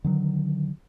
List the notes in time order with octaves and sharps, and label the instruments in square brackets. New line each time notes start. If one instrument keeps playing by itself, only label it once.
[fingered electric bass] D3 D#3 F#3